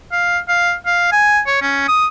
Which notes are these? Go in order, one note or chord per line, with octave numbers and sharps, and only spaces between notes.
F5
F5
F5
G#5
C#5
C#4
D#6